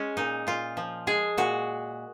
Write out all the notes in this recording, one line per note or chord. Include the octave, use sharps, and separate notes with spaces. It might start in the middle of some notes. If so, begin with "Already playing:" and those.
Already playing: G#3 C#4
A#2 D#4
A#2 F4
F3
G#3 G#4
A#2 F#4